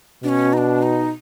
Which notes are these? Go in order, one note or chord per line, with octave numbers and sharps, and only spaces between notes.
B2 D4
C#4
D#4
D4
D#4